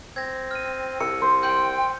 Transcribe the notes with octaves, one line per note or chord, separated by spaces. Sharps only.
C4 G#6 A#6
F6 D#7
C2 E6 C#7
C5
G5 C6 G6